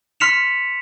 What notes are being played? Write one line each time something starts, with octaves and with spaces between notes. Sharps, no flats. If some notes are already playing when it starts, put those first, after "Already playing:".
C6 F6 B6 C#7 E7 F7